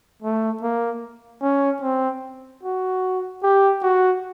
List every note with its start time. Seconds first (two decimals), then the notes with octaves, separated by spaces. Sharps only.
0.22 A3
0.62 A#3
1.42 C#4
1.82 C4
2.63 F#4
3.43 G4
3.82 F#4